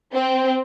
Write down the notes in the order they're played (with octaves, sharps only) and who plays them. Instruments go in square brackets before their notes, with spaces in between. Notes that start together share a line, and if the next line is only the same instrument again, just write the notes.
[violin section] C4